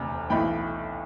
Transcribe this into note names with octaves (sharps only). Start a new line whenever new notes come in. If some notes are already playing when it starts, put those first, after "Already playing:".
Already playing: E1 D2 C3
B1 A2 E3 G5 B5